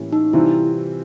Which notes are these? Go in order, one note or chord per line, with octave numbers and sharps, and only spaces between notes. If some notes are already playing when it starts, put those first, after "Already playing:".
Already playing: A2 E3 G3 A#3 C#4
D#4
C3 E3 G3 C4 E4 F4